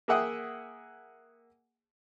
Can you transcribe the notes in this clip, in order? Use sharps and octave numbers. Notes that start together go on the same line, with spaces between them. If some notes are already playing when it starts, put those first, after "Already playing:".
A#3 G#4 E5 F#5 G5 D#6